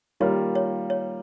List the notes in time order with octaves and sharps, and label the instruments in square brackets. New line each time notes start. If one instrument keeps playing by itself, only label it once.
[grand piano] D#3 G3 A#3 F4 A#4 [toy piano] C#5
[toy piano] C#5
C#5